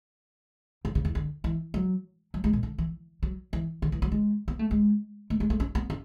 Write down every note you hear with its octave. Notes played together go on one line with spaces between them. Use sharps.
C#3
C#3
E2
D3
E3
F#3
F#3
G#3
B2
D3
E3
F#3
E3
D3
E3
F#3
G#3
B3
A3
G#3
A3
G#3
A3
C#4
B3
C#4